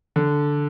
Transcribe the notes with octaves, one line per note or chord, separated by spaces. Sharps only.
D3